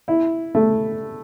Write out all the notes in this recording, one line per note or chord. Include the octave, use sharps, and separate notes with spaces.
E4
A3